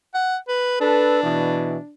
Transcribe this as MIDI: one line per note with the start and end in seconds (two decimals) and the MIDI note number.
0.14 0.37 78
0.48 0.79 71
0.81 1.94 62
0.81 1.20 69
0.81 1.20 71
1.24 1.77 47
1.24 1.77 52